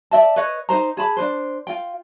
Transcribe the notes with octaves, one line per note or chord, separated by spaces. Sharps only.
D5 E5 A5
B4 C#5 D#5
D#4 A#4 C5 A#5
G#4 A5 B5
D4 B4 C5
F4 G5